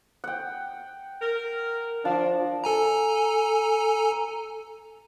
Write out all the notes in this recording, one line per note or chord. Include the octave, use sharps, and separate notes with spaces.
F#5 G5
A#4
F3 D4
A4 G#5 A#5